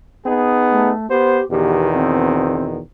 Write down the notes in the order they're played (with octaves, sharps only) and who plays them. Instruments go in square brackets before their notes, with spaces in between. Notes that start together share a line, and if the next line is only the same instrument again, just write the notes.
[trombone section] B3 D#4 G#4
[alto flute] A3
[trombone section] B3 C5 [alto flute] G4
[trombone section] E2 B2 D#3 [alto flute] G4
[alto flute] C4